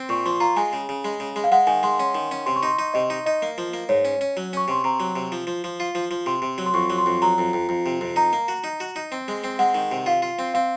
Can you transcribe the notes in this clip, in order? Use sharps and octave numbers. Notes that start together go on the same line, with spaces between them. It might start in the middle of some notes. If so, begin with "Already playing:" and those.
Already playing: C4 C6
A#2 C#6
F3 C6
F4 A#5
G#3 G#5
C#3
C#3
G#3
C#3
G#3
F5
G#3 F#5
D#3 G#5
G#3 C6
C#4 C6
D#3
C#4
C3 C6
C#6
D#4 C6
D#4
C3 D#5
D#4
D#4 D#5
A#3
F3
A#3
G#2 C#5
C#4
C#4
F#3
C#4 C#6
C3 C6
C3 A#5
F#3
C3
F3
F3
F3
F4
F3
F3
C3 C6
C3
F#3
C6
F2 C#6
F#3
C6
F2
F#3 A#5
F2
F2
F2
C3
F2
D#4 A#5
A#3
F#4
D#4
F#4
D#4
C4
G#3
C4
G#3 F#5
D#3
C3
F4 F5
F4
C4
C4 F5